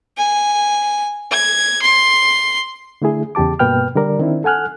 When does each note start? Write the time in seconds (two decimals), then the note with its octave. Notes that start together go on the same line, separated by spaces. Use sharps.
0.18 G#5
1.32 G#6
1.82 C6
3.02 D3 A3 E4 G#4
3.35 E2 C#3 G4 A5 D6
3.59 G2 B2 A#3 B4 G5 F6
3.95 D3 G3 A#4 D5
4.19 D#3 C4 D4 E4
4.44 A4 F#5 G#5 F6 F#6